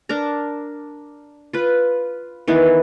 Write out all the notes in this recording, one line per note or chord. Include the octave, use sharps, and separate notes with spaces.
D4 A#4 A#5
F4 B4
D#3 E3 B3